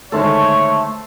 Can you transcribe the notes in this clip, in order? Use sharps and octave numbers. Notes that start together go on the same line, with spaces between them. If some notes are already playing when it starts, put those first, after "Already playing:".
D3 D#3 G#3 A3 A4 C5 C#5 A5